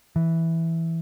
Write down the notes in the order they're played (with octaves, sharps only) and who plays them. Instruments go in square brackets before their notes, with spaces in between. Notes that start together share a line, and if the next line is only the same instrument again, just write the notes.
[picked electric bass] E3